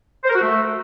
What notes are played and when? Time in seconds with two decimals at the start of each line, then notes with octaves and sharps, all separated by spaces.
0.24 C5
0.30 A#4
0.35 F#4
0.41 A3